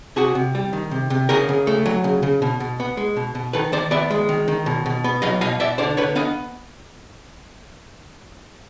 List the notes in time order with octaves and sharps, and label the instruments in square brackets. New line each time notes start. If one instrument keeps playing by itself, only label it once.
[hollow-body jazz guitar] C3 F#4 G#4
C3
G3
D#3
C3
C3
C#3 G#4 A#4
C#3
A3
F#3
C#3
C#3
B2
B2
B3
G#3
B2
B2
D#3 A4 B4
D#3 C5 D5
B3 D5 E5
G#3
D#3
D#3
B2
B2
B3
F#3 D#5 F5
B2 D#5 F5
B2 D5 E5
D3 C5 D5
D3 B4 C#5
B3 D#5 F5